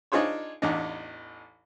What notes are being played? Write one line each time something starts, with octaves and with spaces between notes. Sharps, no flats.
D4 D#4 F4 G#4 C5 C#5
A1 E2 D4 D#4